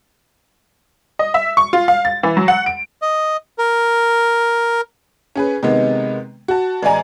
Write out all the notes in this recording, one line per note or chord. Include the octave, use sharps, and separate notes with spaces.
D#5
E5
C#6
F4
F5
A6
E3
F#3
F#5
D7
D#5
A#4
C#4 G#4 B4
C3 D#3 G#3 B3
F#4 A5
A1 G#3 D5 G#5 A#5